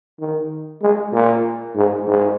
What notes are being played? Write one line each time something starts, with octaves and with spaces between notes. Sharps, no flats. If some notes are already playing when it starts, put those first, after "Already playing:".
D#3
G#3
A#2
G#2
G#2